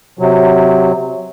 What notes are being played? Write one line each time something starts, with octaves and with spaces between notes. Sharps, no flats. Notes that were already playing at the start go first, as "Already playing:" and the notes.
C3 F#3